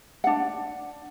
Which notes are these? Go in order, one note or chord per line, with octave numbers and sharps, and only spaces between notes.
D4 F#5